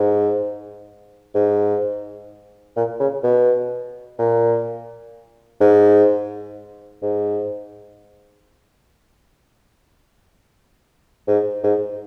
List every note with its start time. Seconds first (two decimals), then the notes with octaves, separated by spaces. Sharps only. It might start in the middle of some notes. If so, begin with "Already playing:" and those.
Already playing: G#2
1.34 G#2
2.76 A#2
3.00 C#3
3.23 B2
4.18 A#2
5.60 G#2
7.02 G#2
11.28 G#2
11.63 G#2